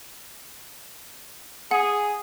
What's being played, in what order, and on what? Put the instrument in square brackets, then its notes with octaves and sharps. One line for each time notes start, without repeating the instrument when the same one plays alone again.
[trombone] G#4 [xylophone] F#5